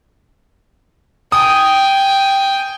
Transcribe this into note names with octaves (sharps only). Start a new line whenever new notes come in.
G5 G#5 D#6